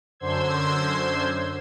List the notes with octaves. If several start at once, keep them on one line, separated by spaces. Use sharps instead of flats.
F#2 D3 C5 C6 E6 G#6